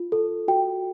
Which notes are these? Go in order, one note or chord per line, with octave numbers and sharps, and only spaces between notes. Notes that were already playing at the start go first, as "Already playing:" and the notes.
Already playing: F4
A4
F#4 G5